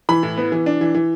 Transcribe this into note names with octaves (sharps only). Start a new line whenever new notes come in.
E3 B5
A2
B3
E3
D4
E3
E3